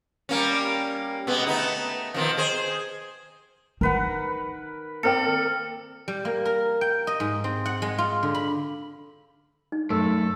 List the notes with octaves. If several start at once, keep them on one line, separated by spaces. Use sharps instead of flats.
G3 A#3 C#4
B2 G#3 B3
A3 B3 D#4
B2 D#3 F3
G#4 C5
D#3 A#4 B4 F#5
A#3 C4 A4 D5 G5 A#5 F6 C#7
G3
A#3
A#4
G5
D#5
G#2
C4
F#5
G#3
F4
D3
B5
D#4
F#2 A3 A4